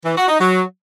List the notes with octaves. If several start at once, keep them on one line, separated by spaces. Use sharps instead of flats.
E3
F#4
D#4
F#3